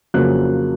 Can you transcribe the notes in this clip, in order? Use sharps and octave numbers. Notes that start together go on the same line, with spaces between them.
F2 C#3 F#3 A#3 F#6